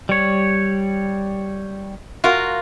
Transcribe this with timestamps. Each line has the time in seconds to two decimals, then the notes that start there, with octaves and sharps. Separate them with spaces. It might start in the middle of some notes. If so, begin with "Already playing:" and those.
0.09 G3 C#5
2.24 F4 F#4 A#4